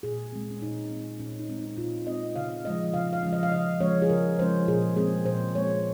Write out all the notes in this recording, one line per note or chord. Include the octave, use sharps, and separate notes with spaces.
A#2 G#4
G#3 C4
C#4
A#2 D#4
G#3 C4
A#2 C#4
D#4
G#3 C4
D#4
A#2 F4
G#3 C4 D#5
C#3 F5
F3 G#3 C#4 D#5
C#3 F5
F5
F3 G#3 C#4
D#5
F5
C#3 D#5
F3 G#3 C#4 C#5
G#4
C#3 A#4
F3 G#3 C#4 C5
A#2 G#4
G#3 C4 G#4
A#2 C5
G#3 C4 C#5